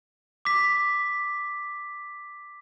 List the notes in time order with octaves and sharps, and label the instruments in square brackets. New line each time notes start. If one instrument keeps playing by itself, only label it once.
[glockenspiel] D6 B6